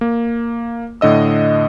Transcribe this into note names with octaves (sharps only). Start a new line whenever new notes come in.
A#3
A2 D3 D#5 E6